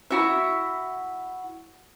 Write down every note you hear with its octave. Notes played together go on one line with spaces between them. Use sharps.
E4 F#4 E5